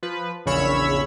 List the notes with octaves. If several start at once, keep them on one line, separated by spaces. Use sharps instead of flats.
F3 B4
A#1 E2 C#3 C#5 B5 E6